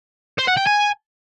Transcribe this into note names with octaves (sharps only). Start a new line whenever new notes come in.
C5
F#5
G5
G#5